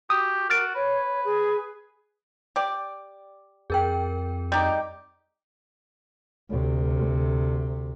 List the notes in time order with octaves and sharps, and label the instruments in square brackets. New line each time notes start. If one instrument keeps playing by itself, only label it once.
[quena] F#4 [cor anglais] G4 [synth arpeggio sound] D#6
[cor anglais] F#4 [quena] A#4 [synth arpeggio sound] F6 A6 D7
[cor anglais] B4 [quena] C#5
[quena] G#4
[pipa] G4 D5
[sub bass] F2 [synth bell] G#4 A#4 G5
[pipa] G3 D#4 G4
[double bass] D2 C3